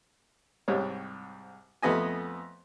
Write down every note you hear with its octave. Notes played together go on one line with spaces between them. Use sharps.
C2 G#2 G3 C#5
F2 A3 B3 D#5 G#5